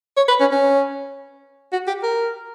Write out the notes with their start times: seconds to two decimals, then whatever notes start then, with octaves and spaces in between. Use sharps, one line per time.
0.17 C#5
0.29 B4
0.40 C#4
0.51 C#4
1.73 F#4
1.88 G4
2.03 A#4